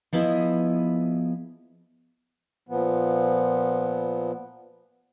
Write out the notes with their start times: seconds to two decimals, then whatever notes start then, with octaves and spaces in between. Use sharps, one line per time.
0.13 F3 B3 E4 G#4 D#5
2.69 A#2 F3 B3